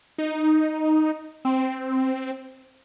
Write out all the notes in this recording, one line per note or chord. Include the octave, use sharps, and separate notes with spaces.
D#4
C4